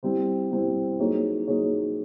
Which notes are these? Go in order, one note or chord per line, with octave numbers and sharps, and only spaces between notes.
G3 C4 E4 G4 C5
G3 C4 E4 G4 C5
F#3 A#3 D#4 G#4 C#5
F#3 A#3 D#4 G#4 C#5